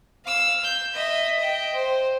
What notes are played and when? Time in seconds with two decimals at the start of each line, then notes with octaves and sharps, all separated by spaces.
0.24 F5 E6
0.64 G6
0.94 D#5 E5
1.37 D#5 G5
1.74 C5